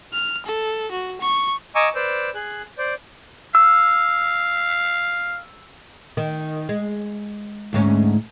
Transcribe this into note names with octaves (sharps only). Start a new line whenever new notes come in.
F6
A4
F#4
C#6
D#5 G#5 A#5 C#6 D6 E6
B4 C5 D5 E6
G#4 F#6
C5 D5
F5 E6
D#3
G#3
D2 G#2 C#4